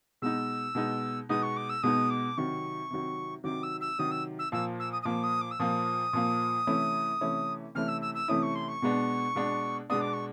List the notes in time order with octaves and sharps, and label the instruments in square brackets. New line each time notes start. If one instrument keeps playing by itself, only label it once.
[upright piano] B2 G#3 B3 D#4 [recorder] E6
[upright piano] B2 G#3 B3 D#4
[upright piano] B2 G#3 B3 D#4 [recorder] D#6
[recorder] C#6
D6
E6
[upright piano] B2 G#3 B3 D#4 [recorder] D#6
[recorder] D6
[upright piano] C3 D#3 F#3 [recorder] C#6
[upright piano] C3 D#3 F#3
[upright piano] C3 D#3 F#3 [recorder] D6
[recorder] E6
E6
[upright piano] C3 D#3 F#3 [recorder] D#6
[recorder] E6
E6
[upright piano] A#2 F3 A#3 [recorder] E6
[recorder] E6
D#6
D#6
[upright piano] A#2 F3 A#3 [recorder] D6
[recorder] D#6
D6
E6
[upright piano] A#2 F3 A#3 [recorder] D#6
[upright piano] A#2 F3 A#3
C3 E3 A3 C#4 E4
C3 E3 A3 C#4 E4
[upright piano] C3 E3 A3 C#4 E4 [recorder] F6
[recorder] E6
E6
E6
[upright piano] C3 E3 A3 C#4 E4 [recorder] D#6
[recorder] C#6
C6
C#6
[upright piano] B2 G#3 B3 D4
B2 G#3 B3 D4
[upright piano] B2 G#3 B3 D4 [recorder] D#6
[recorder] D6
C#6